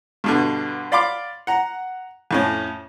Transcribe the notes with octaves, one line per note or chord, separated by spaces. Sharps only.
G2 B2 D3
D5 F5 B5 C6 D6
F#5 A#5
F2 A2 C#4